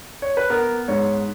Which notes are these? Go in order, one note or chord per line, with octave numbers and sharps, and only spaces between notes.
C#5
B4
B3 A#4
G#2 C#5